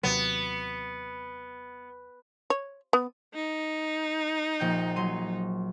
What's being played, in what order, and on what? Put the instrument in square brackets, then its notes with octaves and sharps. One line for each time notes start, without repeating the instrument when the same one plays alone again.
[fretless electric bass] D#2 C3 F#3 [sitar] B3
[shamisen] C#5
B3
[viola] D#4
[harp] A#1 G5 G6
F#3 C6 D#7